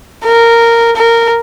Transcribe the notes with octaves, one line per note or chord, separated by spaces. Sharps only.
A#4
A#4